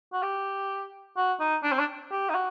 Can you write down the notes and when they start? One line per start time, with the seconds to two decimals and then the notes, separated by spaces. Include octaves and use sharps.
0.13 F#4
0.22 G4
1.17 F#4
1.40 D#4
1.63 D4
1.72 C4
1.79 D4
2.11 G4
2.29 D#4
2.34 F#4